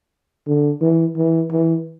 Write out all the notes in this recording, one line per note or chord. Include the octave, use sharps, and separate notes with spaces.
D3
E3
E3
E3